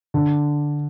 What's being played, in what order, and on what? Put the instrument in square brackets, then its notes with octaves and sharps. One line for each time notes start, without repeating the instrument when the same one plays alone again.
[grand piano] D3